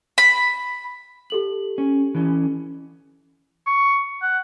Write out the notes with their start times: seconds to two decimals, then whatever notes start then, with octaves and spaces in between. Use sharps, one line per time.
0.18 B5
1.30 G4 A4 F#7
1.78 C#4
2.15 E3 C#4
3.67 C#6
4.22 F#5